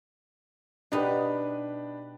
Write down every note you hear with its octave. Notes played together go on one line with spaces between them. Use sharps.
B2 D4 D#4 G4 B4